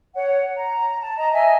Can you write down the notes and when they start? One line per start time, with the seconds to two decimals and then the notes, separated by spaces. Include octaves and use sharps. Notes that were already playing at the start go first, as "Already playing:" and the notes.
0.15 C#5 F#5
0.56 A#5
1.01 A5
1.17 D#5 A#5
1.33 D#5 E5 G#5